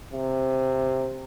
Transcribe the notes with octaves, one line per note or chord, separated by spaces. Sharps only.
C3